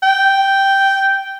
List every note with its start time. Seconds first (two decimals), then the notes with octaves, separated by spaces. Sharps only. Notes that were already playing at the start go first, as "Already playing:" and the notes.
0.03 G5